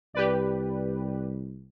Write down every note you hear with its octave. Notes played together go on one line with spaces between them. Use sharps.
C2 G4 B4 D5